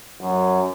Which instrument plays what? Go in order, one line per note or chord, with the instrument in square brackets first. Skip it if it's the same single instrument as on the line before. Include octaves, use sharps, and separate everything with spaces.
[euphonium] F#2